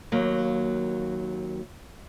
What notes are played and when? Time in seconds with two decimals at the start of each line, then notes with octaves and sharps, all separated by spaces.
0.12 D#2 F#3 A#3